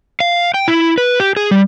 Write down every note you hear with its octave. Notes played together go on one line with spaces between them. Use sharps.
F5
G5
E4
B4
G4
G#4
G3